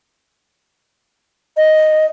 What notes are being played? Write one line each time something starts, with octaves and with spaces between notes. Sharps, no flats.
D#5